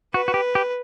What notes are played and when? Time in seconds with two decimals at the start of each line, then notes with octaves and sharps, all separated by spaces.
0.14 F#4 B4
0.28 F#4
0.34 G4
0.55 G4